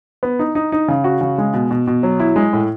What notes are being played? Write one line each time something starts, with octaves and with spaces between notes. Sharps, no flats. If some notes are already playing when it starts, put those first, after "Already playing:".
B3
D#4
D#4
D#4
C#3
F#4
C#3
G#3
B2
B2
B2
F#3
E4
G#3
A2